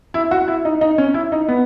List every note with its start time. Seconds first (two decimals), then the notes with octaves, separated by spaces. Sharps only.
0.14 E4
0.31 F#4
0.48 E4
0.65 D#4
0.81 D#4
0.98 C#4
1.14 E4
1.32 D#4
1.49 B3